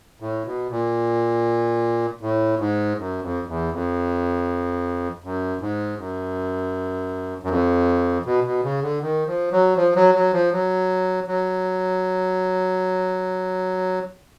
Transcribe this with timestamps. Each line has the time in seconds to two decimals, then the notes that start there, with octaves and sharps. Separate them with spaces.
0.20 A2
0.45 B2
0.70 A#2
2.21 A2
2.59 G#2
2.98 F#2
3.22 F2
3.47 E2
3.72 F2
5.24 F#2
5.61 G#2
5.98 F#2
7.43 F#2
7.50 F2
8.26 B2
8.44 B2
8.63 C#3
8.82 D3
9.01 D#3
9.27 F3
9.52 F#3
9.77 F3
9.95 F#3
10.15 F#3
10.33 F3
10.52 F#3
11.28 F#3